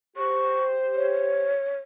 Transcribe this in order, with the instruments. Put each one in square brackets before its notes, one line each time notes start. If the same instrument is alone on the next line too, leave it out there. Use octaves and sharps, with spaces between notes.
[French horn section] G4 C5 [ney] C#6
[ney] C#5